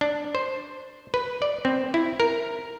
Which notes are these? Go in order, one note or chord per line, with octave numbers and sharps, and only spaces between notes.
D4
C5
B4
D5
C4
E4
A#4